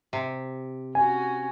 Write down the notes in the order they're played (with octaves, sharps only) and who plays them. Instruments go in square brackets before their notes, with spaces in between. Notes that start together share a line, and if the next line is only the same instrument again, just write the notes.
[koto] C3
[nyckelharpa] C#4 F#4 [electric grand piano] G#5